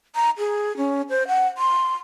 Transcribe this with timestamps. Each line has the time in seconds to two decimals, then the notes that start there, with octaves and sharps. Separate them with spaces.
0.15 A#5
0.38 G#4
0.77 C#4
1.10 C5
1.28 F#5
1.58 C6